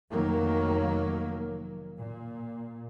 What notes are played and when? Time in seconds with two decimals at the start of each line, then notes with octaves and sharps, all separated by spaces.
0.11 F1 D#3 F#3 A#3
1.98 A#2